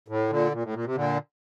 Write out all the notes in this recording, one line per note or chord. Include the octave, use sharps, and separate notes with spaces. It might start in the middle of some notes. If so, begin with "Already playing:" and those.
A2
A#2 D3
A#2
A2
A#2
C3
A#2 D3